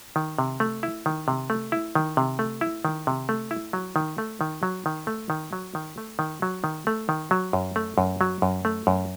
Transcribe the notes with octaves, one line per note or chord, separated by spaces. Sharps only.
D#3
C3
A3
E4
D#3
C3
A3
E4
D#3
C3
A3
E4
D#3
C3
A3
E4
F#3
D#3
A3
D#3
F#3
D#3
A3
D#3
F#3
D#3
A3
D#3
F#3
D#3
A3
D#3
F#3
F#2
A3
F#2
F#3
F#2
A3
F#2